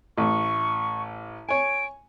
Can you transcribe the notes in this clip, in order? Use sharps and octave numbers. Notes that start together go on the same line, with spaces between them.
A1 C#6
C#5 G#5 D7